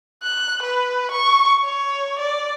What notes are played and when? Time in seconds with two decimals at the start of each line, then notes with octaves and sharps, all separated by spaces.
0.23 F#6
0.62 B4
1.11 C#6
1.64 C#5
2.19 D5